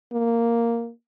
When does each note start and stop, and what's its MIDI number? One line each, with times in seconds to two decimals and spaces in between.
0.13 0.91 58